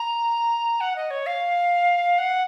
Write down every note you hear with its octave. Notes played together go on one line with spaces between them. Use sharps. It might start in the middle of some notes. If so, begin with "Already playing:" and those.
Already playing: A#5
F#5
D#5
C#5
F5
F#5